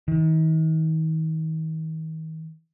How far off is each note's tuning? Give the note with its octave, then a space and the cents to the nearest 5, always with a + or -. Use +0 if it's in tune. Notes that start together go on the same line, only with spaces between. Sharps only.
D#3 +40